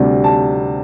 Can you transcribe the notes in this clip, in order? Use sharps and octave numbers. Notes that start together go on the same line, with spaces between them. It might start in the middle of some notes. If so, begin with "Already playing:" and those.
Already playing: D2 C3 G3 D4
A5